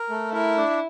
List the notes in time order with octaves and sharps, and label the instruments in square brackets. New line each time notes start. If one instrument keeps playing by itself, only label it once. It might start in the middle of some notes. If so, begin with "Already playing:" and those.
Already playing: [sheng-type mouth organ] A#4
A3
[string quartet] E4 [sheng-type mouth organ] A#4
[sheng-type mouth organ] D4